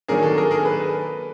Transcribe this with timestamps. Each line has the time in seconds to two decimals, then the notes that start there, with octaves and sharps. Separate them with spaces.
0.08 D#3 F#3 A#3 D4 G#4 A#4
0.23 A4
0.37 G#4 A#4
0.51 G#4 A#4
0.65 A4 B4